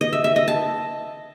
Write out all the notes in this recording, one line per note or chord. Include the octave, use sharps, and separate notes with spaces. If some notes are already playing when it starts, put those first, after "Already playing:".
D#5
E5
E5
D#5
A5